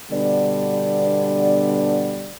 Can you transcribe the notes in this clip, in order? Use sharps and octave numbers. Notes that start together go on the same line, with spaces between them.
B2 D3 G3 B3 D4 D5